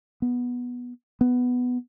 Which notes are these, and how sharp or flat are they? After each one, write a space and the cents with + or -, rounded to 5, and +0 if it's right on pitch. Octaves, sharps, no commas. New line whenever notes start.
B3 -10
B3 +5